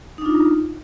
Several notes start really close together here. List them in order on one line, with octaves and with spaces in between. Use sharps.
D#4 D4 F4